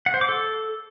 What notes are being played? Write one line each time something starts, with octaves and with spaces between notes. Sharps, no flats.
F#5
C5
D6
A4